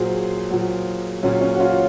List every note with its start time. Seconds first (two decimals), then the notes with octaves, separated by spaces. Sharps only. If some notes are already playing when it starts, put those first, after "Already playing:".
Already playing: A#2 F#3 G#4 C5
0.50 A#2 F#3
1.23 A#2 F#3 C#4
1.41 C#4
1.55 F#4
1.60 C#4 F4